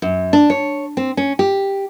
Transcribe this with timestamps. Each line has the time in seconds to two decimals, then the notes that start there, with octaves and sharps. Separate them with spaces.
0.02 F#2
0.33 D4
0.50 C#5
0.97 C4
1.17 C#4
1.39 G4